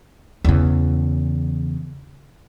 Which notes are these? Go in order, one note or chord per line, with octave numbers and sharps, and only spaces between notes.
E2 C#3